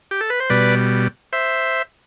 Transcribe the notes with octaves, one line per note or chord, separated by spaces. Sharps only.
G4
A4
B4
C5
B2 G3 B4 D5
C5 E5